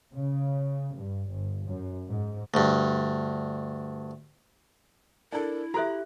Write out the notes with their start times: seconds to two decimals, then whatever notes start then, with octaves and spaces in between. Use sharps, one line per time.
0.14 C#3
0.95 G2
1.28 G1
1.64 F#2
2.08 G#2
2.54 D2 G2
5.32 D4 E4 A4 A#4
5.74 F#4 G4 A4 E5 A#5 F#6